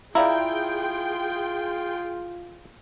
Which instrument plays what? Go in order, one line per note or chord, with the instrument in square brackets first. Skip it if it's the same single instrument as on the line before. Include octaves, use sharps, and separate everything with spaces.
[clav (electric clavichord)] E4 [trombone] F4 [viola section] G#4 G5 C6 [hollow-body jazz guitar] D5 F5 A#5